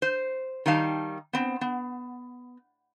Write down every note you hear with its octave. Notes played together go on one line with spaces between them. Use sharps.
C5
D#3 G3 D#4 F5 A5
B3 C4
B3